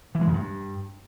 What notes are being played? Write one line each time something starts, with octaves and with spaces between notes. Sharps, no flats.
E3
G#3
F#2
G2